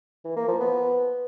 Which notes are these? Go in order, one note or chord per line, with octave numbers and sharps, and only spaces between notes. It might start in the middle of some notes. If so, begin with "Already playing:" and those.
E3
A#3
F3
B3